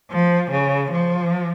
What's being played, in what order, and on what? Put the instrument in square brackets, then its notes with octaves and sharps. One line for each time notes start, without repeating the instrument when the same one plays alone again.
[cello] F3
C#3
F3